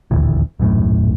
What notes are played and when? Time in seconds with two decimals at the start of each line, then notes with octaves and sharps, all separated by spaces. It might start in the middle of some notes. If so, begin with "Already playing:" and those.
0.11 D#1 A1 D2 A2
0.60 D#1 B1 F#2 A2